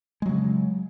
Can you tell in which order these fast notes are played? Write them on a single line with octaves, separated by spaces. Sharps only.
G#3 F#3 C#3